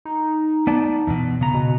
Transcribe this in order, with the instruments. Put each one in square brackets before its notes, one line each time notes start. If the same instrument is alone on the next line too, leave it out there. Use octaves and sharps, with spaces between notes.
[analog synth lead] D#4
[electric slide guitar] B3 D5 A5
E2 B2
C#3 B3 A#5
[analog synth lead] B2